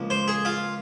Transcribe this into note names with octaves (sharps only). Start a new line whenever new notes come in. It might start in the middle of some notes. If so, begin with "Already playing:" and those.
Already playing: C#2 F3 A#3
C5
G#4
F4